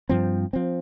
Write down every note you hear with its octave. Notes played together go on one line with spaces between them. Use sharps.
G2 F3 C4
F3 C4